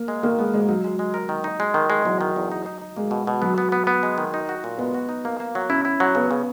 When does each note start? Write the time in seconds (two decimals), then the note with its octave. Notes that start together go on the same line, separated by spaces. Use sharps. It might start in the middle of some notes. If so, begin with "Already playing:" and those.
Already playing: A#3
0.08 G#3
0.23 D#3 A#3
0.38 G#3 B3
0.53 G#2 G#3
0.69 F#3 D#4
0.84 G#3
0.99 G#3
1.14 A#4
1.29 D#3
1.44 D#4
1.60 G#3
1.74 D#3
1.90 G#3
2.05 E2 F#3
2.21 D#3
2.36 E2
2.51 D#4
2.66 D#4
2.82 D#4
2.96 G#3 A#3
3.11 B2
3.27 B2
3.42 F#3 B3
3.58 B3
3.72 B3
3.87 B3
4.03 G#3
4.18 D#3
4.34 D#4
4.49 F#4
4.64 A#2
4.78 G#3 B3
4.94 F#4
5.09 D#4
5.25 A#3
5.40 A#3
5.55 F#3
5.69 C#4 E4
5.85 E4
6.00 F#3
6.15 C#3 B3
6.31 C#3